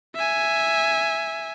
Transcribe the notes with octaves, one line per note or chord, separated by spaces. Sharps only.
E5 G#5